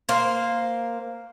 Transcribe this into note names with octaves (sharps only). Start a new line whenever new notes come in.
A#3 C5